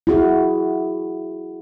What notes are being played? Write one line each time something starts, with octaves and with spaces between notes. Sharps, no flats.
E4 F#4 G#4